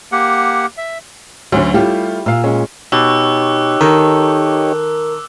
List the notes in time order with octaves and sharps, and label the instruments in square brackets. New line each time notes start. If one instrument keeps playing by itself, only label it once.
[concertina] A#3 G4 F#5
E5
[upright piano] D2 D3 [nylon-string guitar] F#3 C#4
[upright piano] G3 A3 F4 [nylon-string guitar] E4 G4
[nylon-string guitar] A#2 [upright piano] F5 E6
[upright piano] G#3 C#4
[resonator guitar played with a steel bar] B2 [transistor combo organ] D#4 G4 C#5 [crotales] D6 E6 F#6
[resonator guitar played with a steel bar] D#3 A4 [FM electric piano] A#4